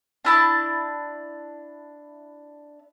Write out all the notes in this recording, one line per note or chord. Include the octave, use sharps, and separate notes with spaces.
D4 E4 A5